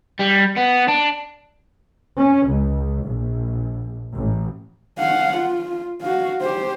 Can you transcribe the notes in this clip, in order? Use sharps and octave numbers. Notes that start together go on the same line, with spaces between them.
G3
B3
D4
C#4
C#2
A#1
A1
F5 F#5
F4
F#4 F5
G4 C5